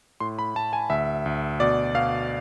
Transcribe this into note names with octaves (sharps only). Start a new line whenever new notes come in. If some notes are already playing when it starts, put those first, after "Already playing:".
A2 C6
B5
A2 A5
G#5
D2 E5
D2
B2 D5
B2 F5